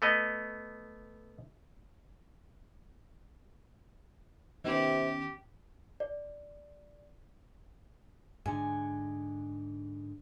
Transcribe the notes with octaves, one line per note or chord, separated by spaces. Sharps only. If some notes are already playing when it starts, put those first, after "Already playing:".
A3 B3 D#5
C3 D#3 B3 C#4 G4
D5
G#2 D3 G#5